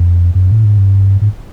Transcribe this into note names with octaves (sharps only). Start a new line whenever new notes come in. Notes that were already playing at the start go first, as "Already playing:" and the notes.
Already playing: F2
F#2
A2
G#2
G2
G#2